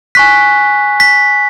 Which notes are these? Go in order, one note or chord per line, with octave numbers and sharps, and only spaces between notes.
G#5 C#6 F#6 B6
B6